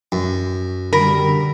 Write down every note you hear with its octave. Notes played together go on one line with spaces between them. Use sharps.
F#2
D3 G3 A#4 B5